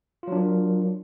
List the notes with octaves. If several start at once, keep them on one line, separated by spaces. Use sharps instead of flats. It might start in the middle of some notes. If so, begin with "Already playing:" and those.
F#3 D4 F4 A#4